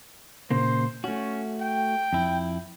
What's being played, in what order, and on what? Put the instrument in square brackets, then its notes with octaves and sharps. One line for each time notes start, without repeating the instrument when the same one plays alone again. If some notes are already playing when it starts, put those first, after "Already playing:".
[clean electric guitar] A#2 C#3 A#3 [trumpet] C5
[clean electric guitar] A3 F#4 [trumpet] C#4
[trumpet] G5
[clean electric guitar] F2 E4